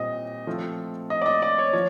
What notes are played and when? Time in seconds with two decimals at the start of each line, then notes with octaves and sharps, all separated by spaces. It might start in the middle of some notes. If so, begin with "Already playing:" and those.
Already playing: A#2 G3 C4 D#5
0.47 F3 A3 C4
1.10 D#5
1.21 D5
1.26 D#5
1.42 D5
1.58 C#5
1.73 F3 C#5